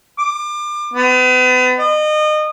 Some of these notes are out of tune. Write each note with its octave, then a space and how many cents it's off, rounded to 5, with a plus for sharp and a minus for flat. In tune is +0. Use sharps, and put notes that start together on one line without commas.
D6 +30
B3 +40
D#5 -30